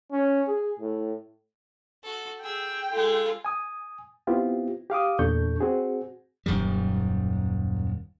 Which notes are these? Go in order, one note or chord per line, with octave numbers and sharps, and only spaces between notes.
C#4
G#4
A2
F#4 A4
G#4 G5 E6
G#3 F4 A4
G#5 D#6
B3 C4 E4 F4 G4
G4 F5 D6 D#6
E2 A#2 D4 A4 C#6 G6
C4 F#4 G#4
D#1 F#2 D#3 G3